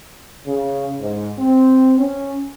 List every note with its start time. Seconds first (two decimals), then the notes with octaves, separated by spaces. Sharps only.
0.46 C#3
1.00 G#2
1.39 C4
1.99 C#4